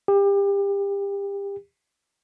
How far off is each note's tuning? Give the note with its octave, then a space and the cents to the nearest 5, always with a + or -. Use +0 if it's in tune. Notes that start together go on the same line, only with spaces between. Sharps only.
G4 +30